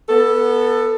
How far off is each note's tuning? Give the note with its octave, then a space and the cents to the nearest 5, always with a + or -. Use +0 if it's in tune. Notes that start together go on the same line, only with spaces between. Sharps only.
B3 -15 A4 +15